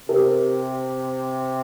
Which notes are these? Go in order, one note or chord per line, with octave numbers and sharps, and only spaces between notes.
C3 G4 A#4